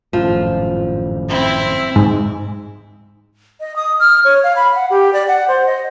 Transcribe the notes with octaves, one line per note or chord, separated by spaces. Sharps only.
G#1 F#2 A2 F3
C4 E4
G#2
D#5
D#6
F6
C#5
F5
B5
F#5
G4
D5
F#5
C5
D#5